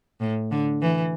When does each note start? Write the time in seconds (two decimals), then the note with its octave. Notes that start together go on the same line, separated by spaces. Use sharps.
0.21 A2
0.51 D3
0.82 E3